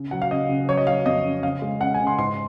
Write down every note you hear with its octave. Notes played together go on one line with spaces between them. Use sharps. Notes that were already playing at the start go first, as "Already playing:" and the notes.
Already playing: C#3
F#3 F#5
F5
C#3 D#5
C#3
F#3 C#5
D#5
F#3 F5
F2 D#5
C#4
C#3 F5
G#3
C#4 F#5
G#5
C#3
C6
G#2 C6